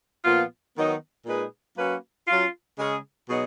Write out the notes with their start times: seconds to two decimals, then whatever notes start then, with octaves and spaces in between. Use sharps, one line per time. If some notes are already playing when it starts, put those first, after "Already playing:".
0.25 A#2 F3 B3 F4
0.76 D#3 F#3 B3 D#4
1.26 A#2 G#3 D#4 G#4 B4
1.77 F#3 A#3 C#4 F#4 B4
2.28 F#3 C#4 F4
2.79 C#3 G#3 C#4 G#4
3.29 B2 F#3 B3 D#4 G#4